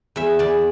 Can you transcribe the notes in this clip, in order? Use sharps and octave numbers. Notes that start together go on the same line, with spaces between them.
E2 E5
E2 D5